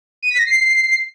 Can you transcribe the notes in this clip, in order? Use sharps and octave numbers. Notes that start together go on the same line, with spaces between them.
D#7
B6
A#6
C7